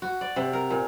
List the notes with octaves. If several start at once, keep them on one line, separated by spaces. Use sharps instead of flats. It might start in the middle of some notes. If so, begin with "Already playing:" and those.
F#4
D5
C3
A#4
A#2